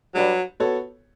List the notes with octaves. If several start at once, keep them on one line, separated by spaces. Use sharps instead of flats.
F#3 G3 D4 G4 B4 D5
B3 F#4 A4 C#5